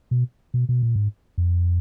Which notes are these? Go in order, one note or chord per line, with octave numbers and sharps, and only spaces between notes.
B2
B2
B2
A#2
G#2
F2